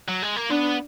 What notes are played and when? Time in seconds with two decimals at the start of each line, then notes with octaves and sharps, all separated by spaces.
0.08 F#3
0.22 G#3
0.36 A#3
0.49 B3 D4